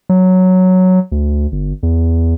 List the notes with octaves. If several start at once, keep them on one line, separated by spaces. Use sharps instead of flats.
F#3
D2
G1
E2